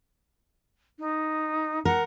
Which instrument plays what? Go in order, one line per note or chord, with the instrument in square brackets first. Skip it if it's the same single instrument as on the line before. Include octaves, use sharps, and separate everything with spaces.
[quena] D#4
[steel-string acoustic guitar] A#4 [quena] F#5